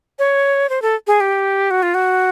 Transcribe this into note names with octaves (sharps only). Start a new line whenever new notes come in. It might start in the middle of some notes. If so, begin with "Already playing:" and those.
C#5
C5
A4
G#4
G4
F#4
F4
F#4